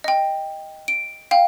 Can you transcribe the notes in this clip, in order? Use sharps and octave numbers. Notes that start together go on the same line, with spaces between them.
D#5 G5
D7
F5 G5